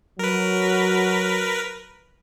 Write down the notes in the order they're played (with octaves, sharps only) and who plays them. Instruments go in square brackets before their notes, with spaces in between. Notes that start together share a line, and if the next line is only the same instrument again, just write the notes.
[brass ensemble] F#3 [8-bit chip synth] A#4 B4